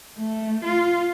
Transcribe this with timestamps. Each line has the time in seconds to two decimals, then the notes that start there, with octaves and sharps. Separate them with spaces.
0.18 A3
0.64 F4